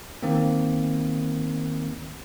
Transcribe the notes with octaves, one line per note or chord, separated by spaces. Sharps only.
D#3 A#3 C4